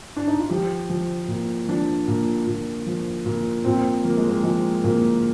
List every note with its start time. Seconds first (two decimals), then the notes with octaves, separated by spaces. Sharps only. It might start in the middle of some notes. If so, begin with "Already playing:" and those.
0.16 D4
0.27 D#4
0.39 F4
0.49 F3 G4
0.90 F3
1.28 A#2
1.68 F3 D4
2.08 A#2
2.46 A#2
2.87 F3
3.26 A#2
3.65 A#2 C4
4.05 F3 A#3
4.17 G#3
4.29 A#3
4.44 F3 G#3
4.84 A#2 A#3